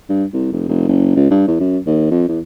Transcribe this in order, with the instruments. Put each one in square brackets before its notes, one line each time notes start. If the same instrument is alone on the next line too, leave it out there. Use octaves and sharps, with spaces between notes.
[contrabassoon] G2
C2
F1
F1
F#1
C#2
G2
E2
F#2
D#2
F2
E2